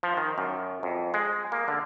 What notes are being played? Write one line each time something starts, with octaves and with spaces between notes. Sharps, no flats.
F3
D#3
F#2
F2
G#3
A#3
D3